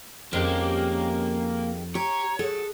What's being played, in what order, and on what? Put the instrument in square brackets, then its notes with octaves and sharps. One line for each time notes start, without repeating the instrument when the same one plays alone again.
[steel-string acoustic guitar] F2 [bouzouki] D#3 G#3 G4 [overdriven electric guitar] A#3 [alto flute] C#4
[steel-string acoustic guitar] G4 [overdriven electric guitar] C#5 [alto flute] A#5
[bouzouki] F#3 [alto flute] G#4 [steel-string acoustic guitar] A4